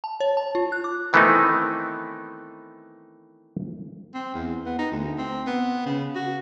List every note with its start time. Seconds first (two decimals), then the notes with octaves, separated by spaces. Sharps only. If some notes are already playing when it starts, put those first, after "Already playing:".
0.04 A5
0.20 C#5
0.37 A5
0.55 F4
0.72 F#6
0.84 D6
1.13 D#3 E3 A3 B3 C4 D#4
4.14 C4
4.34 E2
4.66 B3
4.79 D#4
4.92 D2
5.18 C4
5.47 B3
5.86 C#3
6.15 F#4